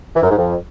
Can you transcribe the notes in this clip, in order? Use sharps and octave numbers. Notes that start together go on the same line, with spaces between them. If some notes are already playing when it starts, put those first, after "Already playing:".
E3
F#2
G#2
F2